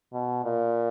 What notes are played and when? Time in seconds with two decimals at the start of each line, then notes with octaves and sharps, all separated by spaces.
0.13 B2
0.45 A#2